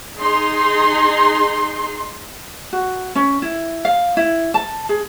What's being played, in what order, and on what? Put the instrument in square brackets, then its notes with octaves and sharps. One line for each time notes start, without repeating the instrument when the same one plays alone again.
[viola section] D#4 G#4 C6
[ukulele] F#4
C#4
E4
F5
E4
A5
G#4